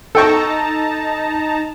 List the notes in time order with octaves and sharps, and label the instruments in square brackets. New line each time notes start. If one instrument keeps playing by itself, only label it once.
[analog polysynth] D#4 A5 A#5 [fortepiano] A4 G5 C#6